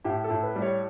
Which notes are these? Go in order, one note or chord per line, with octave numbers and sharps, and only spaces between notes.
A2 G4
A4
A2
B4
G3
C#5